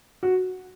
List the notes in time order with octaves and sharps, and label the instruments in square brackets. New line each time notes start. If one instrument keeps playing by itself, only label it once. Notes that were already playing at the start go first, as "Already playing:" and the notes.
[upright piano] F#4